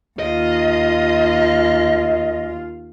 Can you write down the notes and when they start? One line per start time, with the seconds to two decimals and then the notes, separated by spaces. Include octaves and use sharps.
0.20 D#2 F4 D#5